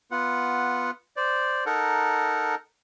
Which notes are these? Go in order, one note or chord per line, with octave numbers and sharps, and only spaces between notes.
B3 F4 F#5
C5 D5
D#4 A4 A#4 F#5